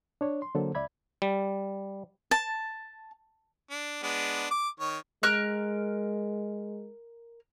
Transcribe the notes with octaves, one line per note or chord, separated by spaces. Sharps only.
D4 C#5
C6
D3 F#3 A#3 A4 C5
C#2 D5 E5 B5 G#6
G3
A5
D4
G#3 B3 D4
D6
D#3 C#5
G#3 A#4 F6 F#6